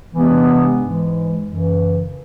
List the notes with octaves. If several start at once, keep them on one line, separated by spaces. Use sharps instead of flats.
C3 E3 G#3 B3 D4
G#2 E3 G#3
F#2 C#3 E3